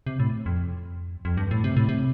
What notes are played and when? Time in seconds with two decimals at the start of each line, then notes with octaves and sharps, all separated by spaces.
0.07 C3
0.20 A2
0.46 F2
1.25 F2
1.37 G2
1.51 A2
1.64 C3
1.76 A2
1.89 C3